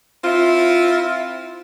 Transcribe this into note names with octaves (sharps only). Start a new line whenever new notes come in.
C4 E4 F4